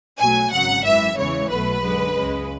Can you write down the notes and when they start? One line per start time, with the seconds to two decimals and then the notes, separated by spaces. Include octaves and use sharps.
0.19 B1 B2 F#3 A3 G#5
0.52 G#1 F#2 C#3 F#3 F#5
0.84 F#2 E3 G#3 E5
1.17 E2 C#3 E3 G#3 C#5
1.49 B1 B2 F#3 A3 B4
1.83 F#2 D3 G#3
2.14 C#2 C#3 G#3